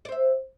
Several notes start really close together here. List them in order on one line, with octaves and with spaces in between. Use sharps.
D5 C5 E5